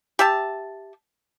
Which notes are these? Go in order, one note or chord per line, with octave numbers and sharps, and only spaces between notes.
G4 E5 A5